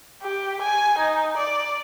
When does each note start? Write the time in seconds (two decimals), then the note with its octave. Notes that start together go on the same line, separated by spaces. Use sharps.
0.23 G4
0.62 G#5
0.98 D#4
1.37 D5